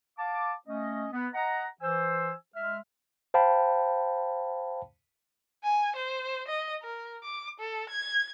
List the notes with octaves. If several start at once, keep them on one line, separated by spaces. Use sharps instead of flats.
F5 A5 D6
A3 C#4 D#5
B3
D#5 F#5 A#5
E3 C5 G#5 E6
G#3 E5 F6
C5 F5 G5 A5 B5
G#5
C5
D#5
A#4
D6
A4
G#6